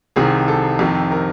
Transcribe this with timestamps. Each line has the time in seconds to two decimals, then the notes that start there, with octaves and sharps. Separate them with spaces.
0.16 C2 C3 D#3 G#4
0.48 A4
0.79 F2 C3 D#3
1.11 A#4